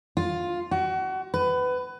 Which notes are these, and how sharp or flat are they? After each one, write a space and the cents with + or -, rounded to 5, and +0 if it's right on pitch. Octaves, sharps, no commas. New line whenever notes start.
F4 +10
F#4 +30
B4 +20